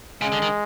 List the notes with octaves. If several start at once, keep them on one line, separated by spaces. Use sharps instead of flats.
C#3 G#3
D3
D#3